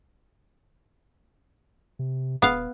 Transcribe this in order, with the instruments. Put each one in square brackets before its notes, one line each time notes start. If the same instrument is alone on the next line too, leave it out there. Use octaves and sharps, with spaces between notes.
[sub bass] C3
[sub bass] D#1 [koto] B3 F5